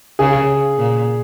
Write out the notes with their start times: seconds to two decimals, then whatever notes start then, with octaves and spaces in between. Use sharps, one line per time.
0.19 C#3 G#4
0.78 A#2